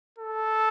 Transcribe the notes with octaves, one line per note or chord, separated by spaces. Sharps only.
A4